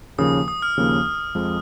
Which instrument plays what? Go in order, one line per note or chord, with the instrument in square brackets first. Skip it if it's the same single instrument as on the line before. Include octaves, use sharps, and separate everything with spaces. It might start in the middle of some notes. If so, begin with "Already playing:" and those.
[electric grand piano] D#2 C#3 F3 A#3 [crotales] D#6
[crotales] D#6
F6
[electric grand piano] D#2 C#3 F3 A#3
F2 F3 G#3